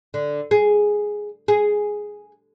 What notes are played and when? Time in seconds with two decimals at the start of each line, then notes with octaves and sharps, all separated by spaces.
0.14 D3
0.51 G#4
1.48 G#4